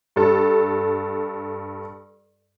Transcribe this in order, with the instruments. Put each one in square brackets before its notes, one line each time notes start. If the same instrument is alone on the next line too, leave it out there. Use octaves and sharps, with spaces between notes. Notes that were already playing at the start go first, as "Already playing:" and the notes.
[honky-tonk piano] G2 A4